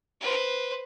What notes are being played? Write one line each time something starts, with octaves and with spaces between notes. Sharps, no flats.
B4 C5